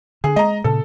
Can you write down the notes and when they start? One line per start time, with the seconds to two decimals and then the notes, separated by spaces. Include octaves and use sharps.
0.24 D3 G#4
0.36 G#3 D#5 A#5
0.64 A#2 C#3 A4